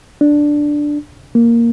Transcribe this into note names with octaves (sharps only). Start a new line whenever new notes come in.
D4
A#3